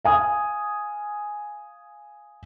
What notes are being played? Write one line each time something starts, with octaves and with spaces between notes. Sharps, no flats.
F5 G#5 D#6